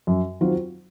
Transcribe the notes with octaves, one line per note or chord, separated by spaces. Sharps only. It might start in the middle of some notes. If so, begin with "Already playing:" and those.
F#2
D#3 F#3 C4 F4